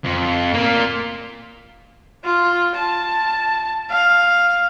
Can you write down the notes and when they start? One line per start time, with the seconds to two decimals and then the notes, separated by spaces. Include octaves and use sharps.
0.04 F2
0.55 A#3 F4
2.24 F4
2.75 A5
3.90 F5